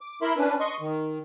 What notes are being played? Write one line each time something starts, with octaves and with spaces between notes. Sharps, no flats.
D6
E4 A#4 E5 B5 C6
C#4 D4 B4
D#5 C6 C#6
D#3